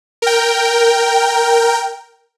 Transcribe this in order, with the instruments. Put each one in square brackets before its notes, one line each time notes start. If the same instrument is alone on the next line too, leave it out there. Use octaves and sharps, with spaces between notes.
[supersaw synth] A#4 G5